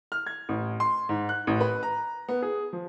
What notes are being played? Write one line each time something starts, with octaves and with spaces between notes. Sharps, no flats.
F6
G#6
A1
C6
G#2
F#6
A1
B4
A#5
B3
G#4
F3